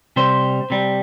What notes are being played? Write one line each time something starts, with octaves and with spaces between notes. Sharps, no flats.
C3 G3 C5
C3 G3